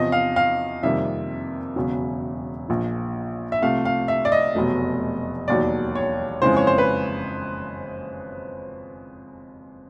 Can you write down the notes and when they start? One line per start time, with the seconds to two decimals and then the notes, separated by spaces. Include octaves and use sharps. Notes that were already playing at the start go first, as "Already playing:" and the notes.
Already playing: E2 C3 F3 D#5
0.12 F5
0.36 F5
0.83 F2 C3 D#3 G3 A#3 E5
1.76 E1 E2 C#3 F#3
2.68 A#1 A#2 F3
3.52 E5
3.62 C2 C3 F3 A3 F5
3.85 F5
4.08 E5
4.25 D5
4.32 D#5
4.55 F1 E2 B2 F#3 A3
5.48 E1 D#2 D#3 F#3 D5
5.95 C#5
6.41 F#1 F2 C#3 E3 G#3 C5
6.57 C#5
6.67 C5
6.78 B4